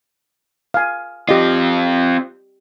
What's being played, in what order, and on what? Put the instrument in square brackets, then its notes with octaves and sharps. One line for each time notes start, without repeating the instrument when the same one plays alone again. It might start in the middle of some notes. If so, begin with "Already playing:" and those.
[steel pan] F5 G#5
[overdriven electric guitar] C4 F4 [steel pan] G4 D#5